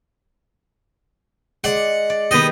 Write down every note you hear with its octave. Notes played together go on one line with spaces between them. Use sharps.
G#3 D5 F#5
D5
D#3 G3 B3 D#5